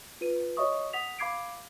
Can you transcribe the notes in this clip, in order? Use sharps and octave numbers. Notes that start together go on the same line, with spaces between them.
F4 B4 D#7
F#4 C#5 D#5 E5 C#6 D#6
F#5 D#6 B6 F7
F5 B5 D6 G#6 C7 D7